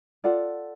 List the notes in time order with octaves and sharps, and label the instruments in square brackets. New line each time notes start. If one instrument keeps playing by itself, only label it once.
[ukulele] F4 A4 D5 F#5